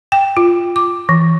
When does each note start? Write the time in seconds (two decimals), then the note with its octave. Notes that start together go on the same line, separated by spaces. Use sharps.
0.12 G5
0.37 F4
0.76 D6
1.09 E3